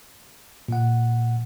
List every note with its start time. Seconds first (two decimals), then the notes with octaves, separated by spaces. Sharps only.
0.68 A#2 F#5